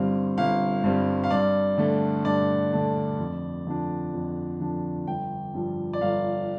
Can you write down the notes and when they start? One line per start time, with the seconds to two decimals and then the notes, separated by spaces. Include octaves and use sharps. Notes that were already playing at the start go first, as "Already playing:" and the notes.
Already playing: G1 G2 G3 C4 F5
0.38 G1 F5
0.84 G2 G3 C4
1.24 F5
1.31 G2 D5
1.78 D3 A3 D4
2.25 G2 D5
2.73 D3 A3 D4
3.19 F2
3.67 D3 F3 D4
4.14 F2
4.60 D3 F3 D4
5.07 G1 G5
5.54 G2 F3
5.93 D5
6.01 G1 F5